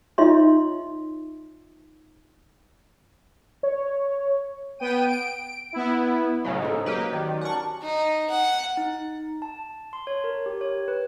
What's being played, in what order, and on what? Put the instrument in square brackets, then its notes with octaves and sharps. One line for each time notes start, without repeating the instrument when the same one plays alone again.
[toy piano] D#4 F4 C#5 D#5 E5 C6
[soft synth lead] C#5
[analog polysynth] B3 G5 D#7
D7
B3 E4
[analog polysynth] A2 C#3 F#3 [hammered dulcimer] C#4 D#4
[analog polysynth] G#2 [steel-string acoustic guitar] D#4 A4 [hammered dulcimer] C5
[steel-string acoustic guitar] F#3 [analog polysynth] A#3 G4 B4
[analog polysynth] D#3 [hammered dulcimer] G4 D5
[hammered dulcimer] C#4 A#4 A5 [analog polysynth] F#5 C#6
[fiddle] D#4
F#5
[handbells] D#4
A5
C6
C#5
A#4
G4
C#5
B4